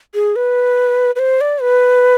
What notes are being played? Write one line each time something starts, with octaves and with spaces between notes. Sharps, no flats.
G#4
B4
B4
C5
D5
B4